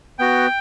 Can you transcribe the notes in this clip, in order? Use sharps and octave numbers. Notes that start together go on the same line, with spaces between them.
B3 F#4 G5